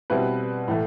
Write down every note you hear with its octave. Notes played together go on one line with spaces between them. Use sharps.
B2 G3 C4 E4 B4
A2 E3 A3